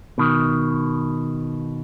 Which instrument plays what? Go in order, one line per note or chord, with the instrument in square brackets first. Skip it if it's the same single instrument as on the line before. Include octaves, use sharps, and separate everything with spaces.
[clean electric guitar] B2 D#3